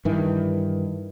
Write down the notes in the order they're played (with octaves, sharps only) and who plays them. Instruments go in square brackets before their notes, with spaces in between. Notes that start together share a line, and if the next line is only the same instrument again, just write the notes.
[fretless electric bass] G2 D#3 E3